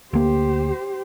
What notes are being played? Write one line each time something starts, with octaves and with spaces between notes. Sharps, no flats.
D2 A#3 G4 C5